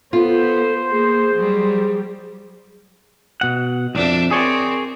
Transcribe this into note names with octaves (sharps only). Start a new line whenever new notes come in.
B3 F4 A4 C5
A#3 G#4
F#3 G3
B2 F#5
C2 F2 D4 E5
C4 G#4 A#4 C#5 D5